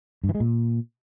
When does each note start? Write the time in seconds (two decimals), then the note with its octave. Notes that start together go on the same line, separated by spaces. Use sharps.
0.24 G2
0.29 E3
0.35 G#3
0.40 A#2